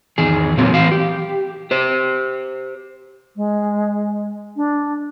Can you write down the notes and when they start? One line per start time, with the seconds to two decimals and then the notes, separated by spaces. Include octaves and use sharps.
0.18 E2 D#3 G#4
0.57 A#2 E3 F#3 A#3 C4
0.73 A2 E3 F5
0.92 G4
1.71 G4 C5
3.36 G#3
4.56 D4